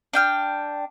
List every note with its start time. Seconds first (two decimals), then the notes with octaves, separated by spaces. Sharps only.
0.14 D4 G5 F6